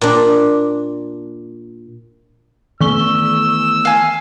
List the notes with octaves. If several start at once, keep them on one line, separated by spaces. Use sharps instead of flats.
A#2 D4
D#3 E3 A3 B3 C#6 E6 G7
F5 G#5